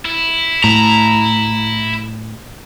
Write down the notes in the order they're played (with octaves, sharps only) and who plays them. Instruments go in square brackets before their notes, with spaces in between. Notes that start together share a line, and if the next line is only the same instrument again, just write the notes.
[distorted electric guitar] E4
[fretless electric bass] A2 [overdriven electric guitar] A#5